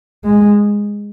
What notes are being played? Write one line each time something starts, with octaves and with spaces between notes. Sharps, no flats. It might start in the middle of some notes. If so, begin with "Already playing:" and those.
G#3